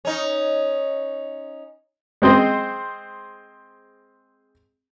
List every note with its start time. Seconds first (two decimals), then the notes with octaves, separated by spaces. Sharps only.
0.05 C#4 D#4
2.22 G#3 C4 G#4 C5 D#5